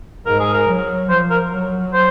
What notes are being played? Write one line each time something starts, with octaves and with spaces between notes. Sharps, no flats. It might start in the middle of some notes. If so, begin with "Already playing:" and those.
G#2 A#4
G#4
A#4
F#3
F3 C5
A#4
F#3
C5